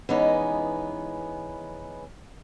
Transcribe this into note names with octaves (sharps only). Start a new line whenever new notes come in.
E3 G#3 B3 C#4 D#4